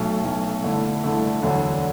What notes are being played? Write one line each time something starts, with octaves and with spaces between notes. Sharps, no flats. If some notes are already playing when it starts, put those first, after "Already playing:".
Already playing: B1 B2 A3
B1 B2 A3
G1 G2 D3 A3 E4
G1 G2 D3 A3 E4
E1 D2 D3 F#3